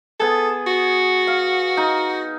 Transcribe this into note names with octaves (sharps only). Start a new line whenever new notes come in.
B3 G#4 A4
F#4
F5
D#4